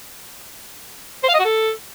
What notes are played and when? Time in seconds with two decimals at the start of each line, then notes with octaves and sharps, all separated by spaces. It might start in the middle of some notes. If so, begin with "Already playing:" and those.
1.23 C5
1.29 F5
1.34 D#5
1.40 F#4
1.45 A4